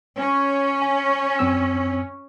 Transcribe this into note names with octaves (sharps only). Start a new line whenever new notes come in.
C#4
G#5
F#2 C4 E6